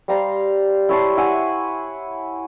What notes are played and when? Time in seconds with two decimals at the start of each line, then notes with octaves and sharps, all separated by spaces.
0.08 G3 C5 F5 A#5
0.89 E4 C#5 A5 C6
1.17 E4 E5 F#5 G#5